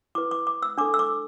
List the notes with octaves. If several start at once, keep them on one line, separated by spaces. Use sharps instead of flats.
E4 B4 D6
D6
D6
E6
D4 A4 D6
E6
D6